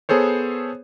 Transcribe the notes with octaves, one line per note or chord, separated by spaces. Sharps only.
B3 G#4 A4 C5 C#5